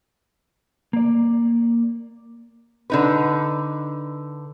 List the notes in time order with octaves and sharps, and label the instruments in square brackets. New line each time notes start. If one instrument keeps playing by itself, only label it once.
[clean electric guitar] A#3 D5
[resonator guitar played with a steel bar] D3 D#4 B4